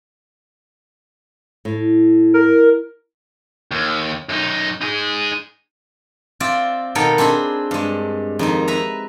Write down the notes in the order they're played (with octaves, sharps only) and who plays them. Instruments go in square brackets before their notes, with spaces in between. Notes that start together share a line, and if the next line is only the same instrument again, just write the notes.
[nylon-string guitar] A2
[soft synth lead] A#4
[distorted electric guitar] D#2
F#2 D#4
D#4 G#4
[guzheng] C4 F4 D5 E5
B2 D#3 B3 A4 A#4 G5
C4 D4 G#4 B5
G2 G#3
F2 D#3 D#4
B4 E5 A#5